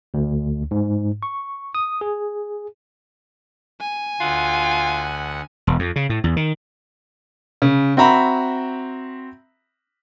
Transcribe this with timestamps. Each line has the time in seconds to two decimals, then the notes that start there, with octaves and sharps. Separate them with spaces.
0.14 D2
0.71 G#2
1.23 C#6
1.75 D#6
2.01 G#4
3.80 G#5
4.20 D2 F4 F#5
5.67 E1
5.79 F2
5.96 C#3
6.09 A2
6.24 E2
6.36 D#3
7.62 C#3
7.97 C4 F#4 E5 A#5 B5